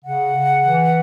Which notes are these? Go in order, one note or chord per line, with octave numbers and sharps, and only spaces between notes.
C#3 F#5
C#3
E3